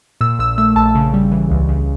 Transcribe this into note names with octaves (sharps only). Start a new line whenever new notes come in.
A#2 E6
A#1 E6
A3 E6
A#1 A5
C#3
G3
E3
C#2
C#3